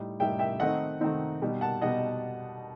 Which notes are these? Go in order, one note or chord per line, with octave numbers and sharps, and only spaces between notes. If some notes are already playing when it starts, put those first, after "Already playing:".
Already playing: A2 G3 D#4
A2 G3 D#4 E5 G5
E5 G5
D#3 A3 C4 D#4 D#5 F#5
D#3 A3 C4 D#4
B2 G3 D#4
F#5 A5
B2 G3 D#4 D#5 F#5